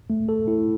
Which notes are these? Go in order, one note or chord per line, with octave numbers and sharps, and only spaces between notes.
A3
A4
E4